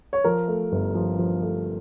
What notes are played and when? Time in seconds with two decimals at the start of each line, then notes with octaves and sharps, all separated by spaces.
0.13 C#5
0.24 F3 A#4
0.48 A3
0.72 G1
0.95 F3
1.19 F3
1.43 A3